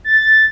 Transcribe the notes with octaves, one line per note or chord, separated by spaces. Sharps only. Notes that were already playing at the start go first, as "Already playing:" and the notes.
A6